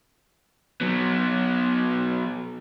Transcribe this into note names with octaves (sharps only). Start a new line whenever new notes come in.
F#3 B3